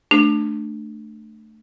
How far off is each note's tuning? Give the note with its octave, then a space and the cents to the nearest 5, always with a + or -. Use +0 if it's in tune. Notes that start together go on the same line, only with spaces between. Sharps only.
A3 +0 D4 +15